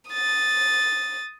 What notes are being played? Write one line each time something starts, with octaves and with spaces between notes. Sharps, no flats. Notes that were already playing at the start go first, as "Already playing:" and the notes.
D#6 A6